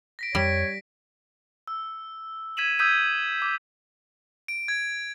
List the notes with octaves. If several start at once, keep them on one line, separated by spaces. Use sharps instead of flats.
A#6 B6 D7
F2 G3 C#5 B6 D7
E6
G#6 B6 D#7 E7 F#7
D#6 E6 G6 G#6 B6 D#7
D6
D7
G#6